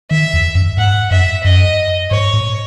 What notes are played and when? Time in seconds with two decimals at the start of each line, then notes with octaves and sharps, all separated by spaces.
0.11 D#3 E5
0.33 E2
0.55 F#2
0.77 G#2 F#5
1.11 F#2 E5
1.44 F#2 D#5
2.11 G#2 C#5
2.33 A2